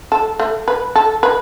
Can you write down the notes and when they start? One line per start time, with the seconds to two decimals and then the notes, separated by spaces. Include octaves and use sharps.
0.12 A4
0.40 A3
0.68 B4
0.96 A4
1.23 B4